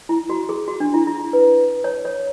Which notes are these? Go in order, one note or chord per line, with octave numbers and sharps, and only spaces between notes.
E4
F#4
G#4
F#4
D4
E4
E4
E4
B4
C#5
C#5